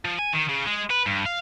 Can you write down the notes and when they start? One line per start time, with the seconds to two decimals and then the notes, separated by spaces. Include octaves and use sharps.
0.05 F3
0.19 G#5
0.33 D#3
0.49 C#3
0.66 G#3
0.90 B4
1.06 G2
1.26 F5